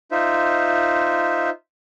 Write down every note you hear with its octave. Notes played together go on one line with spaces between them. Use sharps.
D#4 F4 C5 E5